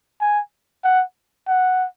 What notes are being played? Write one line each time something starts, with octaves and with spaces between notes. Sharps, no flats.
G#5
F#5
F#5